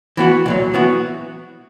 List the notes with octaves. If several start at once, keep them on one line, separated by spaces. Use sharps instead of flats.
E3 B3 F#4
B1 A#2 F#3
E3 B3 F#4